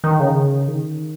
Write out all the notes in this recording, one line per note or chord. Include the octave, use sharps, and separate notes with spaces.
D#3
C#3
D#3